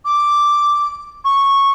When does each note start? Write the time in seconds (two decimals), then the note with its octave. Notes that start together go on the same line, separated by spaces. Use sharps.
0.05 D6
1.25 C#6